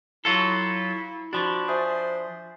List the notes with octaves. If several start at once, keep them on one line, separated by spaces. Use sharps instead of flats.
F#3 E4 F4 A4
F3 D4 F#4 B5 C#6
C5 E5 G#5 D#6